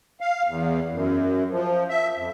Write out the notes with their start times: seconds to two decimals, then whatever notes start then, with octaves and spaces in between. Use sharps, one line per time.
0.21 F5
0.47 E2
0.92 F#2
1.51 F3
1.89 E5
2.16 F2